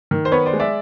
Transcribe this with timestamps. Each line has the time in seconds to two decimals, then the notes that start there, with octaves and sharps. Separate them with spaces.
0.11 D#3
0.25 C5
0.32 B3 B4 C#5
0.46 C5 D5
0.53 G#3
0.60 D5 E5